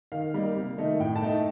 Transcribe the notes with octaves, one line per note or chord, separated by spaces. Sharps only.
D#3 F5
G3 A#3 D#4
C3
D#3 A3 D#4
A2 G5
A5
A3 D#4